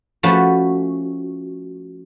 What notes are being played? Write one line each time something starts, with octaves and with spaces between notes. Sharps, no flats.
F3 A3 C#4 F#4 B4